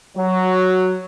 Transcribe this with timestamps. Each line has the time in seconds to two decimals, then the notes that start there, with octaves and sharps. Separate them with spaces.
0.17 F#3